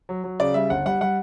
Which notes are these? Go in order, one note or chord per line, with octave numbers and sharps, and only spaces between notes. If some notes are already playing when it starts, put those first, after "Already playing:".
F#3
F#3
C#3 D5
G3 E5
G1 F#5
G3 F#5
G3 F#5